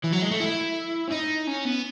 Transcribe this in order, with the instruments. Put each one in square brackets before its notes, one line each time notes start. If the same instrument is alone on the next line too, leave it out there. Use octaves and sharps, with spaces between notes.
[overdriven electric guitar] E3
F#3
G#3
A3
E4
C#4
D#4
C#4
B3